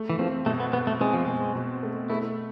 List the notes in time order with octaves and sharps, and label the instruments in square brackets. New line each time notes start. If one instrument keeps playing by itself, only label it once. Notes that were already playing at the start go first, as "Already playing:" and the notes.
Already playing: [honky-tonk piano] A3
[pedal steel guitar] E3
[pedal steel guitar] F3 [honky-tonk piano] C4
[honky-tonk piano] B2 [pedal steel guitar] A3
[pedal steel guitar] B3
[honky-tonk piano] B2 [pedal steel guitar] B3
[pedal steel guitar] A3
[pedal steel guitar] G#3 [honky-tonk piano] C4
[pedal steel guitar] F3
[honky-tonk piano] B2 [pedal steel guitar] G#3
[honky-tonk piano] B2
A3
[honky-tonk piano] A3 [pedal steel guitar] E4